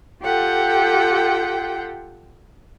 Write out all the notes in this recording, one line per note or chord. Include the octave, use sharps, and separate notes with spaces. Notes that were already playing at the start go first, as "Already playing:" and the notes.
F4 G4 A4 F#5 G5